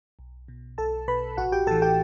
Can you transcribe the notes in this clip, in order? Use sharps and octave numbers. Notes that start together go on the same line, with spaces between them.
B1
B2
B1 A4 A5
B2 B4 B5
A1 F#4 F#5
G4 G5
A2 E3 A4 A5
G4 G5